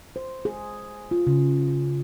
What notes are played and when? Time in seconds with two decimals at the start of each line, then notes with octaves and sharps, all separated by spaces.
0.16 C5
0.45 G#4
1.11 F4
1.27 C#3